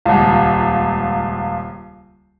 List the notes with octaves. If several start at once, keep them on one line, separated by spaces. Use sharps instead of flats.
D#1 C#2